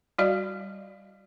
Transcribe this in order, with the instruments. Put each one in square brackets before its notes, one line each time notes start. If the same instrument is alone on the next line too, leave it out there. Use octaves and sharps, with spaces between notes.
[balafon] G3 F#4 D5 D#5 F5